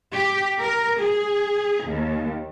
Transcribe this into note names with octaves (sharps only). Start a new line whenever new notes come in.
G4
A#4
G#4
D#2